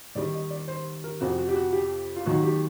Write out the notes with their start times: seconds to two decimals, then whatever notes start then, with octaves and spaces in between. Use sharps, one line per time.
0.15 D#2 D#3 G3 D5
0.34 D#5
0.50 D5
0.68 C5
1.04 A#4
1.20 F2 C3 F3 F#4
1.38 F#4
1.49 G4
1.56 F#4
1.73 G4
2.16 F4
2.26 D#2 D#3 F#3 F#4
2.43 G4